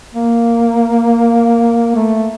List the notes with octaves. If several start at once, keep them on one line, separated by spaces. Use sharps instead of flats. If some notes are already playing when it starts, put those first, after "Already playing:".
A#3
A3